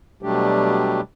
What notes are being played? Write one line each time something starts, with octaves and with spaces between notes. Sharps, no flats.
B2 F#3 G3 A3 D4 G4